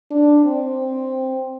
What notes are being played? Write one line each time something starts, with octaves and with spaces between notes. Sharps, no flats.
D4
C4